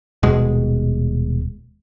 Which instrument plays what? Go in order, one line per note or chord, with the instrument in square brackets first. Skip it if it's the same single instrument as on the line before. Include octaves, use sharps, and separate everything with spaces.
[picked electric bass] D#1 B2 G#3